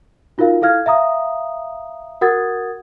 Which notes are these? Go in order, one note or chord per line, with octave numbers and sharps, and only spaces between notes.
D#4 F4 F#4 A#4 F5
E4 A4 F5 F6 G#6
E5 F5 A#5 D#6
F#4 A#4 F#5 D#6 G#6 A6